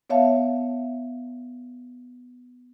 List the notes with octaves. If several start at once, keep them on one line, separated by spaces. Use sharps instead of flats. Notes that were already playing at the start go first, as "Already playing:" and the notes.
B3 C#5 E5 F5 A5